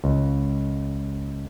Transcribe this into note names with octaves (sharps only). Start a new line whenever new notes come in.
C#2